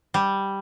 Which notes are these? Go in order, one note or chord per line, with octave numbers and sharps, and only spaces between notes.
G3